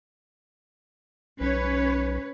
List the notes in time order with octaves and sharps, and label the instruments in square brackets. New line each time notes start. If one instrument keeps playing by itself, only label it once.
[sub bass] B1 [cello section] C#4 B4 C#5